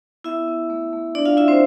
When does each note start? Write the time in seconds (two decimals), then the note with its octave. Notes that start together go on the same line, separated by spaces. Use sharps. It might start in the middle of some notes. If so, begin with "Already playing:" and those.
0.24 B3 E4 E5
0.48 B3
0.70 A3
0.93 A3
1.15 C4 D4 D5
1.25 F4 F5
1.37 A3 E4 E5
1.48 C4 C5